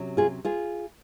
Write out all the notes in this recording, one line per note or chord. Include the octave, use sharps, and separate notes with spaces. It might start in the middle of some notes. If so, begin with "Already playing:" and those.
Already playing: C3 F#3 C#4
F4 G#4
F4 G#4